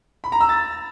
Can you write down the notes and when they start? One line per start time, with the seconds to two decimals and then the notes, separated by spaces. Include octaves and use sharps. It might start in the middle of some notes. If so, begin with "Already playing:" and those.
0.24 B5
0.32 A#5
0.41 E6
0.49 A6